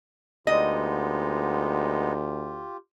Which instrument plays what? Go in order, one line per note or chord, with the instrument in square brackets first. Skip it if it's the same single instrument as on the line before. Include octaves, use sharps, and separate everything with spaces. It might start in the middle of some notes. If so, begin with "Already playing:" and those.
[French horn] D2 [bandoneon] G#3 B3 D#4 [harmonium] F4 G4 [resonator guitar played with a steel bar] D#5